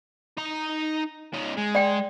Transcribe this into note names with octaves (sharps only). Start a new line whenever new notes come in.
D#4 A#5
C#4 D#4
G#3
D5 G5